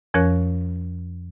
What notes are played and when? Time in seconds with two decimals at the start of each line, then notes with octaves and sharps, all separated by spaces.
0.14 F2 F3 C#4 A#4 C#5 F#6